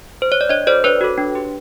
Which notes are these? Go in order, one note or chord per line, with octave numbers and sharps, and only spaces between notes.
C5
C#5
D5
D4 C#5 D#5
F#4 A4 C5 D5
D4 B4 C#5
F#4 A4
D4
G4